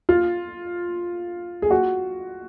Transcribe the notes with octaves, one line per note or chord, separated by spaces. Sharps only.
F4
G#4
F#4